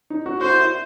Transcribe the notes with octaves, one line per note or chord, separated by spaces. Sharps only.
D#4
F#4
F#4 C5
E4
E4